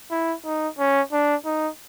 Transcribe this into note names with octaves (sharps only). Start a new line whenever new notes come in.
E4
D#4
C#4
D4
D#4